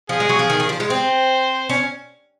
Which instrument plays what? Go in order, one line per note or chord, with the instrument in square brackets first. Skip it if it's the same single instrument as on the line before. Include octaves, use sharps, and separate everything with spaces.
[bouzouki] F3 [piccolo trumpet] G#4
[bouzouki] G#3
F#3
F3
D#3
D#3
F3
G#3
[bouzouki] C4 [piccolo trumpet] C5
[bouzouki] C#4